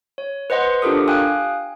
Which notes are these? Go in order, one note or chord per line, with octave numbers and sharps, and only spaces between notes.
C#5
B4 C5 D#5 F#5 C6
D4 F4 G4 A4 A#4 D#6
F5 G5 G#5 D#6 F#6